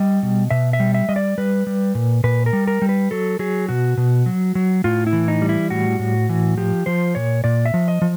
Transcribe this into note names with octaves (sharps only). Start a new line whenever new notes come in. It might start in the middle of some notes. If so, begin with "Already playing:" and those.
Already playing: G3 D#5
B2
B2 E5
E5
G3
E5
G3 D#5
D5
G3 B4
G3
A#2
A#2 B4
A#4
G3
A#4
G3
B4
F#3 A4
F#3 G#4
B2 F#4
B2
F#3
F#3
A2 F4
E4
E3
D#4
G3
E4
A2 F#4
A2
E3
F3 G4
F3 C5
A#2 C#5
A#2 D5
E5
F3
D#5
F3